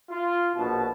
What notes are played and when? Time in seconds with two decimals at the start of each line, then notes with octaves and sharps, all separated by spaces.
0.11 F4
0.56 A#1 B2 A5